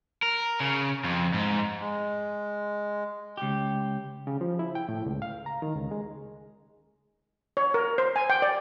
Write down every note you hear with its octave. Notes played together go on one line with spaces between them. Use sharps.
A#4
C#3
F2
G#2
G#3
C#2 G4
C#3
F3
E4
G5
A2
C#2
F5
A#5
D#3
C#2
G#3
C#5
A#4
C5
G#5
G5
D5